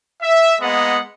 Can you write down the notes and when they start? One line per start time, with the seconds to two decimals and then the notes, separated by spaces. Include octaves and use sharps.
0.22 E5
0.61 G#3 A#3 B3 D#5 F#5